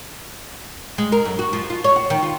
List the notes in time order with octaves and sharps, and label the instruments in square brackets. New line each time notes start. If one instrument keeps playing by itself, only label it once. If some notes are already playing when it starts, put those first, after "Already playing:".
[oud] G#3
A#4
F#2
F#4
F3
F4
C#5
F#4
D#3
F4